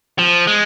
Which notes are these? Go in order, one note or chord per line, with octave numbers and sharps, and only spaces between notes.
F3
G#3